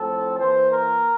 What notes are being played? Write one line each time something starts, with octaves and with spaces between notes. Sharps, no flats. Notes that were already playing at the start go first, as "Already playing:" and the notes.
Already playing: A2 F3 C4 A4
E3 A#3 C5
A#4